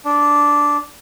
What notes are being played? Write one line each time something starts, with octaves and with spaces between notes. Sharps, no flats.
D4